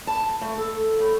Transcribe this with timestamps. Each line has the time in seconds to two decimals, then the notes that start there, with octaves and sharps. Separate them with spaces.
0.07 A5
0.41 A3
0.58 A4
0.99 A2